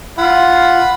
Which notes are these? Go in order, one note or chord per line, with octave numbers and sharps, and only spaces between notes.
F4 F#5 B5